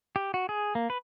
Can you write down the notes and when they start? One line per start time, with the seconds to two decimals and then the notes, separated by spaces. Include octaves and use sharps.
0.16 G4
0.34 F#4
0.49 G#4
0.75 A#3
0.90 B4